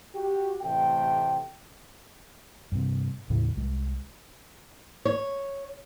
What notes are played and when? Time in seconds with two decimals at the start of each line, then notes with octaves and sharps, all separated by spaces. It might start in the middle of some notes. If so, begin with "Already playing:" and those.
0.15 F#4 G4
0.62 A1 C3 A3 G5
2.72 G2 C3
3.30 D#2 A2 C#3
3.57 C2 G#3
5.05 C#5